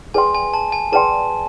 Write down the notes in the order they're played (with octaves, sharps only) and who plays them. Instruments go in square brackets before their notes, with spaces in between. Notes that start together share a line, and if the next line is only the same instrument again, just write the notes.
[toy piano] G#4 B4 D5 G5 C6 [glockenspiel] G#5
[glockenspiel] G#5
A5
G#5
[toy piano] G#4 B4 D5 G5 C6 [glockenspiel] A5